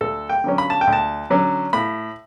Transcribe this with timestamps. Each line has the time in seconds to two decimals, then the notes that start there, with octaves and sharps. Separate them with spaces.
0.01 D2 A4
0.29 G5
0.44 D3 F#3 C#4
0.58 B5
0.70 A5
0.81 G5
0.87 D2
0.93 A5
1.30 D3 F#3 C#4
1.73 A2 B5